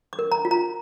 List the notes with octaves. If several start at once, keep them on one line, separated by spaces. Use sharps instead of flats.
D6
A#4
A#5
F4
A#5